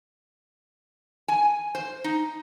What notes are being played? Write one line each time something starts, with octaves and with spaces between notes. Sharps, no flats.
G#5
C5
D#4